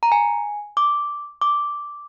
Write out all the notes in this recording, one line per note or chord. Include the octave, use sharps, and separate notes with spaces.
A#5
G#5
D6
D6